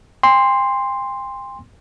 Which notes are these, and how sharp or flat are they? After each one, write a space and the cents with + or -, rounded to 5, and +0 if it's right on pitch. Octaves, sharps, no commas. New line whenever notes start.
G5 +45 C6 +0